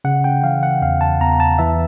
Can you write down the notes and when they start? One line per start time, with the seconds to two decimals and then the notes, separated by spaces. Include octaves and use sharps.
0.04 C#3 F#5
0.24 G5
0.43 E3 F5
0.63 F#5
0.82 E2 F5
1.01 A5
1.21 E2 A#5
1.40 A5
1.59 E3 E5